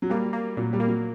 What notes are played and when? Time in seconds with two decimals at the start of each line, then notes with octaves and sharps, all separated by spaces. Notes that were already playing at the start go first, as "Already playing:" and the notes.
0.02 F#3
0.10 G3 A#3
0.33 A#3
0.57 A#2 F#3
0.73 G3
0.80 A#3
0.88 F#3